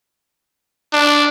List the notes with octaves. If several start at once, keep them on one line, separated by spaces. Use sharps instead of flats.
D4